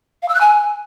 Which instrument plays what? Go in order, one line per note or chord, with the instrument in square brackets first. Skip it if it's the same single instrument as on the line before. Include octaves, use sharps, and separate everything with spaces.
[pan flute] F5
E6
F#6
G#5